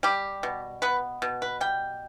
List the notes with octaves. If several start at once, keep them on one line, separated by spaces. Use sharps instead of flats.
G3 G4
B2
B3 B4
B2
B4
G3 G5